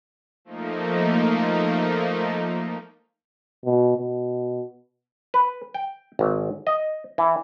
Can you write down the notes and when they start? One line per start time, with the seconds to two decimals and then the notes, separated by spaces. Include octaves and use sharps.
0.45 F3 A3 A#3 D#4
3.65 B2
3.97 B2
5.34 B4
5.74 G5
6.19 G#1
6.67 D#5
7.18 E3